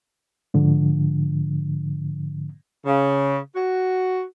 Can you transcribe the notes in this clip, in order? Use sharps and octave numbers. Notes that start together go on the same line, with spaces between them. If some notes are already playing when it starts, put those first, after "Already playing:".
G#2 D3 F3
C#3
F#4